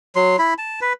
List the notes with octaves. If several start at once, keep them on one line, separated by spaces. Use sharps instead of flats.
F#3 C6
E4 B5
A5
B4